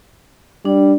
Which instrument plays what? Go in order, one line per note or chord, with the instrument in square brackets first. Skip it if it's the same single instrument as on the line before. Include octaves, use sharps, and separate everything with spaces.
[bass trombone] G3 [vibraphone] D4